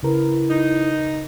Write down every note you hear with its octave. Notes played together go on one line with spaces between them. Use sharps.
C#3 E4 A#4 B4
D#4